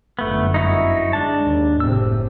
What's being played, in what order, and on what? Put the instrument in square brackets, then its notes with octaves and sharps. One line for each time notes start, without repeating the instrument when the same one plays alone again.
[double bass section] G1 F#2 [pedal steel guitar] A3 B3
[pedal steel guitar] D#4 E4 F#4
[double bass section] G#3 [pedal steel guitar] D4 A5
[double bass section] D#2
[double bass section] F#1 A2 C3 [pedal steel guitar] E6